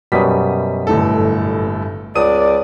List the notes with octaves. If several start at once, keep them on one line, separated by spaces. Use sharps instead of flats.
F#2 B2 G3 D#6 B6
G1 A2 A4
C#2 D5 D#6 D#7